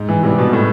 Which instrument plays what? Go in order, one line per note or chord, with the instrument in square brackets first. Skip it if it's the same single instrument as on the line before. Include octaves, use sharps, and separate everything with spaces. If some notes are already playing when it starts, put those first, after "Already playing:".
Already playing: [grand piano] G#2
[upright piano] E3
[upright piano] C3 [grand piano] E3 G3 B3
[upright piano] B2
A2